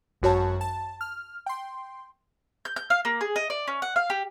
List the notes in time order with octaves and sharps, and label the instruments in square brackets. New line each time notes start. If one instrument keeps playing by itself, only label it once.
[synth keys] G#1 F#2 F#4 C#5 A5
A5
F6
G5 C6
[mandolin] G6
G6
F5
A#3
G#4
D#5
D5
C#4
F#5
F5
G4